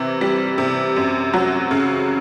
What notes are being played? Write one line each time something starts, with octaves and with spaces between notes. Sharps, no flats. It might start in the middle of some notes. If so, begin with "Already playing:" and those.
Already playing: C3 E3
G3
C3
F#2
F#3
C#3